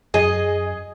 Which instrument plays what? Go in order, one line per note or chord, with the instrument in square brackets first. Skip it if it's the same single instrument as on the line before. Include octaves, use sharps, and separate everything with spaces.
[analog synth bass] F#2 [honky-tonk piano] G#4 [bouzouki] D#5